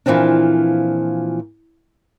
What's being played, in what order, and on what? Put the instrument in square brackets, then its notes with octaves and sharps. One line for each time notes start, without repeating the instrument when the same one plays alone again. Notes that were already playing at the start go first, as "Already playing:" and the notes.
[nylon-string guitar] A#2 E3 F3 C4 D4